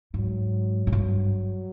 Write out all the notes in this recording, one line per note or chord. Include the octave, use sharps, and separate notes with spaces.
G#2 F#3
G#2
G2